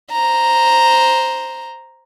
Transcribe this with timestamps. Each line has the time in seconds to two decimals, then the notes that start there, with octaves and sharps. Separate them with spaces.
0.12 C5 A#5